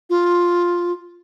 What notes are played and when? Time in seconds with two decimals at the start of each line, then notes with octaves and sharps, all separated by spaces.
0.10 F4